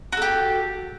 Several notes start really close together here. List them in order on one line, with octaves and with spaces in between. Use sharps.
F#4 A4 G4